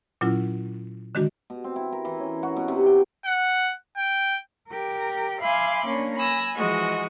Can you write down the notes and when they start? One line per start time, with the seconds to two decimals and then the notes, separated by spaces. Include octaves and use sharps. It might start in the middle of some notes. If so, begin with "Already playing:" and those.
0.21 A#2 F#3 C#4 E4 F4
1.15 D3 D#3 G#3 D4 F#4
1.50 B2
1.64 C4
1.76 E4
1.92 A#4
2.05 E3
2.19 C#4
2.43 F#4
2.56 B2
2.68 C3
2.86 G5
3.26 F#5
3.97 G5
4.69 G4 A#4
5.41 E5 F5 G#5 B5 C6 D6
5.86 A#3 C#4 D4
6.17 G#5 B5 E6 A#6
6.55 E3 F3 G#3 F#4 D#5